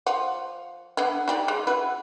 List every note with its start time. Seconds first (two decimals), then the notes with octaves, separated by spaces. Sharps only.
0.06 F3 F#5
0.97 D3 B3 E4
1.28 D#4 G4 D5
1.48 G#3
1.67 E4 F#4 B4